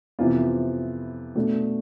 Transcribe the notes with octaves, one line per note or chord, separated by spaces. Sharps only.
F2 C3 E3 B3 F4
B2 A3 D4